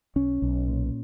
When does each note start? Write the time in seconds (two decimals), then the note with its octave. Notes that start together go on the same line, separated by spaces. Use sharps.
0.16 B1 C#4
0.42 B1
0.68 A#2